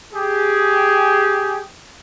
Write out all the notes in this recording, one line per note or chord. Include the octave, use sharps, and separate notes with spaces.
G4 G#4